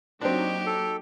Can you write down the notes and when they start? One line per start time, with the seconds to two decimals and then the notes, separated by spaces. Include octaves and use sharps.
0.21 F#3 A#3 C4 D4 D#4 G4
0.67 A4